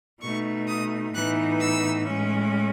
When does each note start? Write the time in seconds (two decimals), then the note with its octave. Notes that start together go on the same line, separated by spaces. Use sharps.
0.22 B2 A3 D#4 C#6
0.68 D#6
1.14 A2 E3 B3 D#4 F#6
1.61 E6
2.08 A2 G#3 C#4